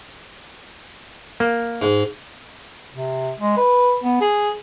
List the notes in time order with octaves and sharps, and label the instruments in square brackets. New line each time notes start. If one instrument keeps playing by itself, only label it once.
[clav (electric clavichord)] A#3
[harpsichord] G#2
[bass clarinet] C3
G#3
B4
B3
G#4